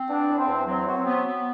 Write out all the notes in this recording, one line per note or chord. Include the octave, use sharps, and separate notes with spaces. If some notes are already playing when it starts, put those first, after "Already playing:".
Already playing: C4
B3 D4
E2
C4
E2
F#3 C4
F#3
C4
B3
B3